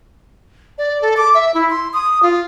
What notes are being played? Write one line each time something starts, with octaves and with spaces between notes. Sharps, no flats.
D5
A4
D6
E5
E4
C6
D#6
F4